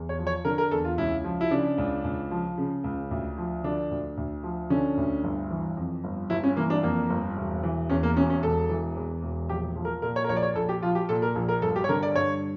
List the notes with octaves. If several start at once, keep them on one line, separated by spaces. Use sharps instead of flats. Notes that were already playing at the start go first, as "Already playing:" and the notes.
Already playing: E2
C#5
F3
C#5
D3 A#4
A#4
E2 A4
F4
C#2 E4
F3
E4
C#3 D4
C#2
C#2
F3
C#3
C#2
D2
F3
D3 D4
D2
D2
F3
D3 C#4
D2
G1
E3
F2
G1
G1 E4
C#4
E3 A#3
D4
F2 A#3
G1
E1
E3
E2 C#4
A#3
E1 C#4
C#4
E1 A4
E3
E2
E1
A#1 G4
F3
A#4
A#2 A#4
C#5
A#4
A#1 C#5
D5
C#5
A#1 A4
G4
F3 F4
G4
A#2 A4
A#4
A#1
A#4
G1 A4
G4
C#5
D3 A#4
D5
G2 C#5